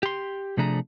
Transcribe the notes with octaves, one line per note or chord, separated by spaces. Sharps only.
G4 C6
C3 F3 A3 D4 G#4 A#5